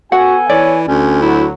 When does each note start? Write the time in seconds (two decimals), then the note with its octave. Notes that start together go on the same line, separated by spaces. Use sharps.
0.12 B3 F#4 A4 F#5 G#5
0.49 E3 C#5 D5
0.88 D2 C#4
1.22 F#3 E4